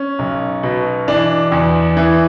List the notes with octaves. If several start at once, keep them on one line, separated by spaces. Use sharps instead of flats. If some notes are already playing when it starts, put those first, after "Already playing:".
Already playing: C#4
B1
B2
E3 D4
E2
E3